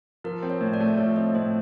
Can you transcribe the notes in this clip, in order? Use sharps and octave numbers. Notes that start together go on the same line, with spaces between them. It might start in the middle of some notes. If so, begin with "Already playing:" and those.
F3 A#4
C4
C#5
A2
D5
A3
F3 C#5
C4 D#5
A2 C5